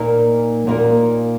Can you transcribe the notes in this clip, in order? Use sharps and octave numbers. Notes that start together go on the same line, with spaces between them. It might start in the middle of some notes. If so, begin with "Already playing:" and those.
Already playing: A#2 A#3 D#4 A#4
A#2 A#3 D#4 A#4